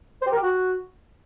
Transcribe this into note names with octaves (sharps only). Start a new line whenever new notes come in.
C5
G4
A#4
G4
F#4